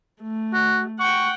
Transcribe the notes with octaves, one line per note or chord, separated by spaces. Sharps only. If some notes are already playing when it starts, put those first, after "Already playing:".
A3
F#4
F#5 G5 C#6